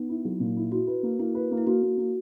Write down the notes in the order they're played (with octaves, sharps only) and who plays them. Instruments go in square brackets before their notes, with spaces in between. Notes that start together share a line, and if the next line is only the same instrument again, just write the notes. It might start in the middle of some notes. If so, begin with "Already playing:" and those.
Already playing: [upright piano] B3 [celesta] D#4
[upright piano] E4
F#3
A#2
E4
[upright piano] E4 [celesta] F#4
[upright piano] B4
A#3
[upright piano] A#3 [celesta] E4
[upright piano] B4
A#3
[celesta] E4
[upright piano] A#3 [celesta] F#4
[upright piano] A#3
A#3